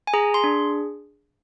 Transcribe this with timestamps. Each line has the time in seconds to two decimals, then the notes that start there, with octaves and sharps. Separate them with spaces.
0.07 G#5
0.14 G#4 A#5
0.34 C6
0.44 D4